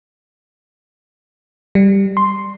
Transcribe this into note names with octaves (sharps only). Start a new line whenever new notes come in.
G3
C6